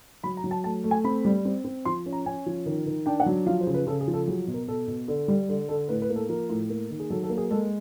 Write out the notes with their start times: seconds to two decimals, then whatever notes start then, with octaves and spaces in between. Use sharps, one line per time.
0.24 F#3 B5
0.37 A#5
0.44 F#3
0.51 A5
0.64 A3 A5
0.84 A3
0.91 G#5
1.04 C4 B5
1.25 G3
1.45 C4
1.65 C4
1.85 F3 C6
2.06 C#4
2.12 A#5
2.26 C#4 G#5
2.46 F3
2.66 D#3
2.86 D#3
3.06 D4 G5
3.20 F#5
3.26 F#3
3.46 F3 F5
3.61 C5
3.67 C#3
3.74 B4
3.87 C#3 A4
4.01 G#4
4.08 F3
4.13 A4
4.27 F#3 G#4
4.47 B2
4.54 A#4
4.68 B2 A4
4.88 B2
5.08 D3
5.28 G3
5.49 D3
5.69 D3 A4
5.89 A2 B4
6.02 B4
6.10 A#3
6.16 A4
6.29 F3 A#4
6.49 A2
6.70 A#3
6.90 D#3
7.00 G#4
7.10 F#3 A4
7.23 A4
7.30 A#3
7.38 G#4
7.51 G#3 A4